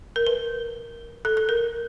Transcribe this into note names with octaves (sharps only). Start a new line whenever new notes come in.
A#4
B4
A4
A4
A#4